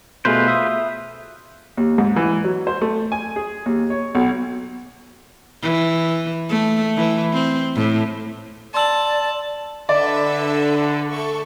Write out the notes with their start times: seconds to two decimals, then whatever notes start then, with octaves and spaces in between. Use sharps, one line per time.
0.25 B2 A3 F4 G#4 B4 C5
0.48 E5 D#6
1.78 D#2
1.98 G#2
2.16 E3
2.44 F#3
2.67 C5
2.82 A3
3.12 G#5
3.36 G#4
3.66 D#2
3.90 C#5
4.15 B1
5.63 E3
6.49 A3
6.96 E3
7.33 C4
7.76 A2
8.74 D5 A5 C6 E6 F#7
9.89 D3 A4 B4 D5 E5
11.10 A3 A4 C#6